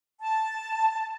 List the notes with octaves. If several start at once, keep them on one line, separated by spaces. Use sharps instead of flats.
A5